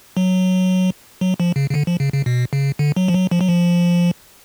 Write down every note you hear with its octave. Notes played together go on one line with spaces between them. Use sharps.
F#3
F#3
F3
C#3
C#3
D3
F3
C#3
C#3
B2
C#3
D3
F#3
F3
F#3
F3
F#3
F3